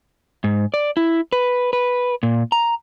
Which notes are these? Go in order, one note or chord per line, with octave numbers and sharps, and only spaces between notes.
G#2
D5
E4
B4
B4
A#2
A#5